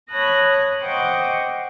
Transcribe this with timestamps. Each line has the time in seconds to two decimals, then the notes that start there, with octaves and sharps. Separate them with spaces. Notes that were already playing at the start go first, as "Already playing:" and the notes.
0.11 C#5 A5 B5 D#6 F#6 A#6
0.82 C5 D#5 F#5 G5 C#6 D6